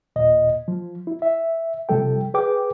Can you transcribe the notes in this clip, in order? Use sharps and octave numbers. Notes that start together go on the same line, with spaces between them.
D#2 A#2 D#5
F3
E4
E5
C3 F3 G3 A4 G5
G#4 B4 G5 D6